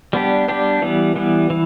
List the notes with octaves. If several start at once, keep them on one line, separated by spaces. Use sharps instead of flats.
G3 B3 D4 G4
G3 B3 D4 G4
E3 G3 B3
E3 G3 B3
E3